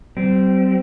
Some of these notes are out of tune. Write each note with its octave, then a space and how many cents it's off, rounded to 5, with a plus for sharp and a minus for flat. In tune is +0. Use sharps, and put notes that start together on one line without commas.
G3 -45 C4 -15